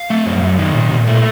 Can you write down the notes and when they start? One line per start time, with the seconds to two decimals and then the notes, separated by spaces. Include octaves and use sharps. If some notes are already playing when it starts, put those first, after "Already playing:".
Already playing: F5
0.10 A3
0.26 F#2
0.42 F#2
0.59 D#3
0.74 A#2
0.91 A#2
1.07 A3